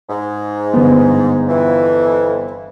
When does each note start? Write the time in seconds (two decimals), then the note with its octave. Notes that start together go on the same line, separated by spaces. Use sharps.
0.10 G#2
0.74 G1 B3
1.49 F2 E3